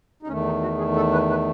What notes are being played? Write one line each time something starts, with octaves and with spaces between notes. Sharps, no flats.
D#4
E2 D#3 A3 C#4
D#4
F#4
G#4
A4
B4
B4